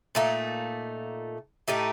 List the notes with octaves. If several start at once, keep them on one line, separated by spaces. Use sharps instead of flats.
A#2 A3 D#4
A2 A3 D#4 G4